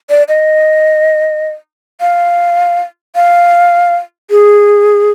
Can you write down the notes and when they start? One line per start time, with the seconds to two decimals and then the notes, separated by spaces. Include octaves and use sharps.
0.10 D5
0.29 D#5
2.01 F5
3.15 F5
4.31 G#4